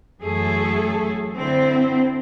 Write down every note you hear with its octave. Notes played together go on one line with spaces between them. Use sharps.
F#2 E3 F#3 A3 G#4 A4
D3 C4 E4 C5